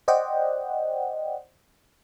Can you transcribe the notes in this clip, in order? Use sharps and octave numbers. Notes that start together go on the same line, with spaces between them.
C5 D5 D#5 F#5 G5